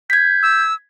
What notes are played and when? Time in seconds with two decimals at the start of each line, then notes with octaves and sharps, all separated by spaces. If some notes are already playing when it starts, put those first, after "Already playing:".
0.10 G6 G#6 B6
0.43 E6